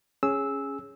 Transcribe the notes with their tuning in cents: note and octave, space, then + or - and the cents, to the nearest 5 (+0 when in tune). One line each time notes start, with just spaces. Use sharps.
C#4 -5 G#4 +0 E6 -10